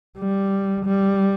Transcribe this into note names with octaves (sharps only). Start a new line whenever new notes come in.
G3
G3